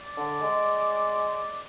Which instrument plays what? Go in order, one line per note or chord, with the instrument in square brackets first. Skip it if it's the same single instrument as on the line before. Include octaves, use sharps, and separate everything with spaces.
[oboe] D5
[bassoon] D3
G#3